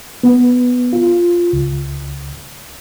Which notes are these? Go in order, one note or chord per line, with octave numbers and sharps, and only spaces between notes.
B3
F4
C#2